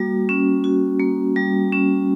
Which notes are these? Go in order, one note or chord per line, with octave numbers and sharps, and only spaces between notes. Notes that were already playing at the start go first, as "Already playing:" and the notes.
Already playing: G3 A#3 F#4
C#4
F#4
A#3
G3
C#4